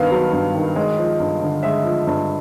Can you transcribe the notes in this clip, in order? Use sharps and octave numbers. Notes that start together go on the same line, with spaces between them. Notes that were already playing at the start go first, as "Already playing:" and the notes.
Already playing: G2 D#3 B3 F5
F#3
G2
D#3
G#3
F3
G2
D3
G#3 E5
F3
G2